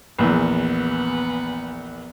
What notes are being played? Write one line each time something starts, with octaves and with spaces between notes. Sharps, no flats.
A#1 E2 B3